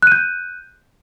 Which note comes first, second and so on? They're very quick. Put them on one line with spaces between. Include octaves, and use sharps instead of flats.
F#6 D#7 G6